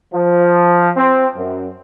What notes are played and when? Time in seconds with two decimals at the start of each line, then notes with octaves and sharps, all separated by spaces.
0.14 F3
0.96 C4
1.36 F#2